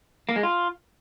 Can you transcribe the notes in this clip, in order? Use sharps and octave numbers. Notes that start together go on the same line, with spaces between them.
A#3
G#3
F4